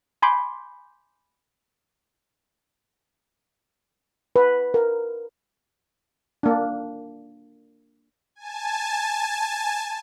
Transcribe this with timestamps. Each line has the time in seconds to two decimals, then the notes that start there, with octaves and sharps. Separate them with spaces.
0.22 G#5 B5 C6 D6 G6
4.36 B4
4.74 A#4
6.43 A#3 D4
8.35 G#5 A5